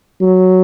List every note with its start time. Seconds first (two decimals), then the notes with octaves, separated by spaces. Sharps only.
0.22 F#3